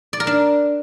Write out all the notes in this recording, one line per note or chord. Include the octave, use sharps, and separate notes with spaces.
D5
A#4
D4